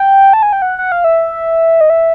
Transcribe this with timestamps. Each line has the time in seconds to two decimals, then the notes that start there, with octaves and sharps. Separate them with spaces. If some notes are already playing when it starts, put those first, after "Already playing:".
Already playing: G5
0.33 A5
0.43 G#5
0.53 G5
0.62 F#5
0.79 F#5
0.92 F5
1.04 E5
1.81 D#5
1.90 E5